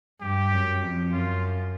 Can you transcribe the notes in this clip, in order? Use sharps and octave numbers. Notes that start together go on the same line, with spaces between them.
G2 G4
F#2
F2
F#2 F4